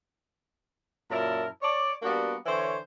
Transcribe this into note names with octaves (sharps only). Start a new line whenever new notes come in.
F#2 A#2 E4 A#4 A5
C#5 D5
G3 A#3 B3 D4 F#4
D3 E3 C5 C#5